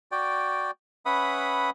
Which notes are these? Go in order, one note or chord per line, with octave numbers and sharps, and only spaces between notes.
F#4 D5 G5
C#4 B4 E5 F#5 B5 D#6